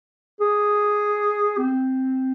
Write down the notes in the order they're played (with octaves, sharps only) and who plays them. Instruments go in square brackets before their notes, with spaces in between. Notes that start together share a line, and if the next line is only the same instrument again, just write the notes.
[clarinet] G#4
C4